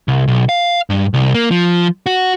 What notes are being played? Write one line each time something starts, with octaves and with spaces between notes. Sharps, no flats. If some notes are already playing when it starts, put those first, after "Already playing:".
C2
B1
F5
G2
C2
A#3
F3
F#4